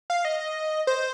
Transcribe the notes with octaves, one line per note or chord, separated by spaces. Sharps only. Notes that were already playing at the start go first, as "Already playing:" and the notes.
F5
D#5
C5